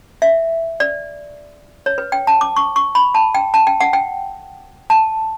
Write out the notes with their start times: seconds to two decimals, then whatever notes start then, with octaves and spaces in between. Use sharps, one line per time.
0.22 E5
0.80 D5
1.86 C#5
1.98 B4
2.12 G5
2.27 A5
2.41 D6
2.57 C#6
2.76 C#6
2.95 B5
3.15 A5
3.35 G5
3.54 A5
3.67 G5
3.80 F#5
3.93 G5
4.90 A5